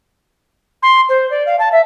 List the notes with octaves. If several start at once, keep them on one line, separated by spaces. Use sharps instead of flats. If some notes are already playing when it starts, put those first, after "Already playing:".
C6
C5
D5
F5
A5
E5